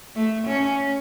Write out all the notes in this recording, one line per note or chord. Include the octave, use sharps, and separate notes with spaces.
A3
C#4